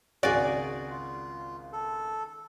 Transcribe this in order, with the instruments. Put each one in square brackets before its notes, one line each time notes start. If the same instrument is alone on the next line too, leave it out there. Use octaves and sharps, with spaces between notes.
[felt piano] G#1 C#2 F#6 [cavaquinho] F#4 G#4 [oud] D5
[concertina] F4
A4